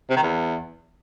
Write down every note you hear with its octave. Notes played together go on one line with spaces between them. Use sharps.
C3
D#3
E2